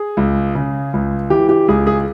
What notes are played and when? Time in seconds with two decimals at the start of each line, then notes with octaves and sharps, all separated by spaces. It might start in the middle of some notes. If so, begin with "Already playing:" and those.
Already playing: G#4
0.17 C#2
0.55 C#3
0.94 C#2
1.30 E3 G4
1.49 G4
1.68 C#2 G#4
1.87 G#4